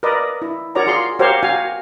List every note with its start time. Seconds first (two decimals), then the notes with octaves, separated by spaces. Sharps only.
0.03 A#4 B4 D5 D#5
0.42 E4
0.75 F#4 A#4 C#5 D5 A#5
0.87 F4 G#4 C6
1.19 F#4 G4 A#4 C5 C#5 F5
1.43 F#4 A#4 F5 G#5